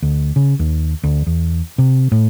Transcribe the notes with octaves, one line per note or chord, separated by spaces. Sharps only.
D2
C#3
D#2
D2
E2
C3
A2